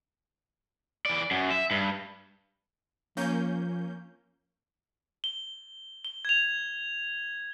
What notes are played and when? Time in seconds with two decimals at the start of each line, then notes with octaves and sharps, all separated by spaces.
1.06 E3 D5
1.31 F#2
1.51 E5
1.71 G2
3.17 F3 A#3 C#4 G6
5.24 G7
6.05 G7
6.25 G#6 F7